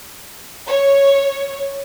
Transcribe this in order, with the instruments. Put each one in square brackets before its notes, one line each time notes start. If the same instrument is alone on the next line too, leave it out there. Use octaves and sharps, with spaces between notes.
[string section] C#5